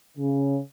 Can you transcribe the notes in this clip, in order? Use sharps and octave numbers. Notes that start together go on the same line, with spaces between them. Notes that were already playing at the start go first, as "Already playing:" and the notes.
C#3